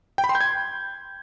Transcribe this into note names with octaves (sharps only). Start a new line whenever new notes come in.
G5
B5
C6
G6
G#6